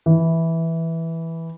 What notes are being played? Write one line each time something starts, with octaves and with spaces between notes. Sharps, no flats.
E3